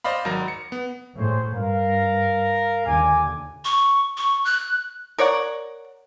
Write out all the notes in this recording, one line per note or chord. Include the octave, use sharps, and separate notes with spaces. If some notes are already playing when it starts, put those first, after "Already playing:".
C5 D5 D#5 F5 B5
G#1 F#3 A#4 A#5 A#6
C#7
B3
A2 G#4 C5 C#5
G2 A#4 F5
D#2 A#2 D3 G#5 D6
C#6
C#6
F#6
A#4 C#5 D5 F#5